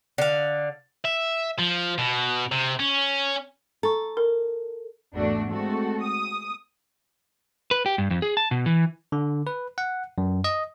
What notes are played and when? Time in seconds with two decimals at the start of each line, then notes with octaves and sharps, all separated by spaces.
0.18 D3 F5
1.05 E5
1.59 F3
1.98 B2
2.52 C3
2.79 C#4
3.83 A4 A#5 C#6
4.17 A#4
5.15 G#1 E2 A3 D4 F#4
5.49 G#3 A3 C4 F#4 A4
6.02 D#6
7.71 B4
7.86 G4
7.98 G2
8.10 F2
8.22 G#4
8.37 A5
8.51 B2
8.66 E3
9.12 D3
9.47 B4
9.78 F#5
10.18 F#2
10.44 D#5